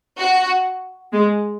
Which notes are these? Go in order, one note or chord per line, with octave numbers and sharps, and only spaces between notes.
F#4
G#3